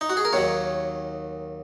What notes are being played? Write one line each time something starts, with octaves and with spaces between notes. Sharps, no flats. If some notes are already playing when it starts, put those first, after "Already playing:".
D#4
F#4
G#4
A#4
D#2 D#3 F#3 C#5